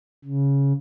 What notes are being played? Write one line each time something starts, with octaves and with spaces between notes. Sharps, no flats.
C#3